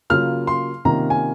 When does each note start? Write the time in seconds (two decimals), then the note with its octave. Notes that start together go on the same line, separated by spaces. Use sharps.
0.10 C#3 F#3 A#3 F4 F6
0.47 C6
0.85 C3 D#3 A#3 C#4 F4 A#5
1.10 G#5